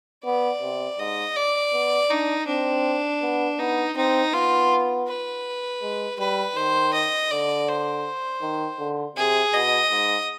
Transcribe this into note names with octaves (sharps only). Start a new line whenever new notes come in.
B3 D5
C3
G#2 D#5
D5
B3
D4 D#4
C4 D4
B3
B3 D#4
C4 D#4
B3 F4
B4
G#3
G3 B4
D#3 C5
D#5
D3 D5
C5
D#3
D3
C3 G#4
B2 D#5
G#2